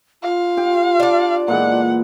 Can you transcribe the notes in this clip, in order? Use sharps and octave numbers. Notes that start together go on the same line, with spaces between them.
F4 F5
G4 G5
D4 D5
A#2 E3 G#3 F#5